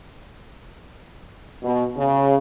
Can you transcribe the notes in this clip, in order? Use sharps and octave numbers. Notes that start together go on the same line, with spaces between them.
B2
C#3